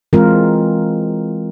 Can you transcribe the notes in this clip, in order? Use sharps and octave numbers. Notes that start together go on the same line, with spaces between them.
E3 G#3 C4 F4 A#4